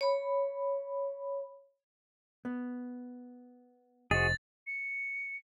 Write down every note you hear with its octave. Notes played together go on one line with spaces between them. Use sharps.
C#5 B5
B3
F1 F#4 G#4 C5 D#5 A6
C#7